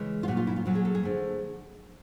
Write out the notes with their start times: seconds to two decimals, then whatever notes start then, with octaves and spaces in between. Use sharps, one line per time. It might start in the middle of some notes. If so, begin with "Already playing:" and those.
Already playing: C#3 E3 G#3
0.23 F4
0.28 A#2 F#3 A3 F#4
0.37 F4
0.47 E4
0.56 F4
0.65 A#2 F#3 A3 F#4
0.75 G#4
0.85 A4
0.95 G#4
1.03 D3 F3 A3